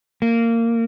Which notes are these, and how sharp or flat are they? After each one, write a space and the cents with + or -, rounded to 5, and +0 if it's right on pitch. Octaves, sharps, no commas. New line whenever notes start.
A#3 -15